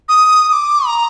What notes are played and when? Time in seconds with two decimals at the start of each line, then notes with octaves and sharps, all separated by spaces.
0.09 D#6
0.49 D#6
0.52 D6
0.87 A#5